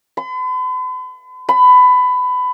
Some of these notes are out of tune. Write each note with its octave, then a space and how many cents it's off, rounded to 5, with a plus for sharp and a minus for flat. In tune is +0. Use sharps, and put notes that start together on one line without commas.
B5 +45
B5 +20